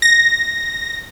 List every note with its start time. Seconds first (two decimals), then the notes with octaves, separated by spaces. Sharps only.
0.02 A#6